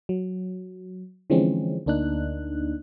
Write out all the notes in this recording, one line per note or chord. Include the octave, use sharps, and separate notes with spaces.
F#3
D3 E3 F3 G#3 C4 C#4
D2 A#3 D4 D#4 F#6